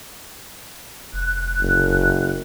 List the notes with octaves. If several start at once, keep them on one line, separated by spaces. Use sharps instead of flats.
F1 F#6
F#1